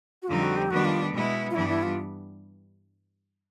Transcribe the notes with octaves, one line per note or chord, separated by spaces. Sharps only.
F#4
F2 D3 G3 C4 D#4 F4
F#4
G4
D#3 G3 B3 D4 F#4
F4
B2 G#3 B3 E4
F4
G2 E3 G3 B3 D4 E4
E4
F4